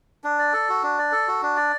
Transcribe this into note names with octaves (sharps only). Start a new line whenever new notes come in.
D4
D5
A4
F#4
D4
D5
A4
F#4
D4
D5